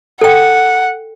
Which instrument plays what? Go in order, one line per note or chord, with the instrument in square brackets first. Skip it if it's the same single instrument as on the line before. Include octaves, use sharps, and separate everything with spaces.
[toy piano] A4 G5 [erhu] F#5